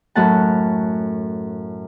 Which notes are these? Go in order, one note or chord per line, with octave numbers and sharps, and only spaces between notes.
F#2 A2 A3 F#5 A5